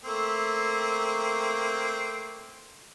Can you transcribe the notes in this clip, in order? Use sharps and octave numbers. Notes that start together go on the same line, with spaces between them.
A3 A#3 C4